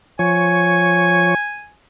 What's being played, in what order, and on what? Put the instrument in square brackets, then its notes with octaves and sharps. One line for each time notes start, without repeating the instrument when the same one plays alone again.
[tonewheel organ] F3 C#5 [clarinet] G#5